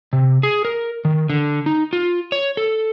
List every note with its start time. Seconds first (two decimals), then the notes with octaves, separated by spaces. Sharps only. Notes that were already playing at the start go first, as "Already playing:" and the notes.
0.13 C3
0.43 G#4
0.65 A#4
1.05 D#3
1.30 D3
1.66 D#4
1.93 F4
2.32 C#5
2.57 A4